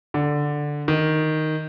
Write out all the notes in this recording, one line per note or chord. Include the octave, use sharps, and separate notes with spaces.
D3
D#3